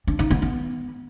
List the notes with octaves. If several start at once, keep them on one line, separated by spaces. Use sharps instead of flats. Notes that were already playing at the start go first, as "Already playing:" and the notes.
D4
D#4
B3
B3